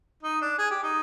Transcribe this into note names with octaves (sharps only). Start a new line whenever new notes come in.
D#4
D4
G#4
G4
D#4